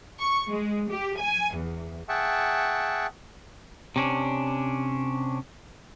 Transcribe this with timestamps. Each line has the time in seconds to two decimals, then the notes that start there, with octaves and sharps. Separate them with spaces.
0.19 C#6
0.50 G#3
0.91 G4
1.21 G#5
1.56 E2
2.09 G#4 E5 F#5 G5 A5 C#6
3.96 C3 C#4 D4